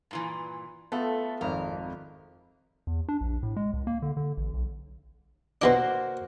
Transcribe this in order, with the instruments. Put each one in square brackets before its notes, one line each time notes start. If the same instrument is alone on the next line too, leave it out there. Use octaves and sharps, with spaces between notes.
[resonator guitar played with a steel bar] G2 A#2 E3
[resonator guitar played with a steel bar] A3 [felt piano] B3 F4 A4
[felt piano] G#1 F2 F3 [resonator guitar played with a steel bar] A#4
[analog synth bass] E2
D4
A#1
A2
G#3
C#2
A#3
D3
D3
A1
B1
[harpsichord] B2 E3 D4 [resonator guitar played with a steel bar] A#3 F#4 C5